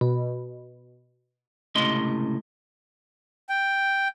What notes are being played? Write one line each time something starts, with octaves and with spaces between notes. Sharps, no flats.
B2
C#2 A2 C3 D#5 C6
G5